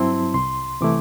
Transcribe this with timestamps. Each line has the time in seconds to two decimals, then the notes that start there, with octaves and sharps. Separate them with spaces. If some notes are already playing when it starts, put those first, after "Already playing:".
Already playing: G2 F#3 C4 E4 A5 C6
0.34 C2 C6
0.81 C3 E3 A3 E4 D6